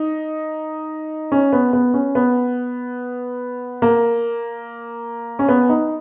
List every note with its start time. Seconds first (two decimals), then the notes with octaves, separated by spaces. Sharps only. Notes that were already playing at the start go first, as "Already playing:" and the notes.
Already playing: D#4
1.32 C#4
1.53 B3
1.73 B3
1.94 C#4
2.15 B3
3.82 A#3
5.39 C#4
5.49 B3
5.69 D#4